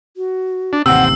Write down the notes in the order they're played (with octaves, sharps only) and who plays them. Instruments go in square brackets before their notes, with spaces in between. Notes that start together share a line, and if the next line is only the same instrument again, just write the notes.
[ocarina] F#4
[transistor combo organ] D4
[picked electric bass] A1 D#2 C3 [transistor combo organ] C4 [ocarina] F#5 [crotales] E6